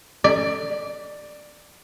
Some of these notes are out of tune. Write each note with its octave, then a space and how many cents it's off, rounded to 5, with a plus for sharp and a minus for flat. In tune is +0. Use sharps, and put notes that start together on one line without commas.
D5 +15